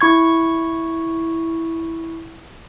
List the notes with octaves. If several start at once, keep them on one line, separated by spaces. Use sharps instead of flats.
E4 C#6 G#6